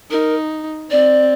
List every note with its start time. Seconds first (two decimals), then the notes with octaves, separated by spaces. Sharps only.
0.11 D#4 A#4
0.91 C4 D5